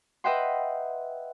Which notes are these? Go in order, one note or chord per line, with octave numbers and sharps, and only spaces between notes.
B4 D#5 E5 F#5 G5 C6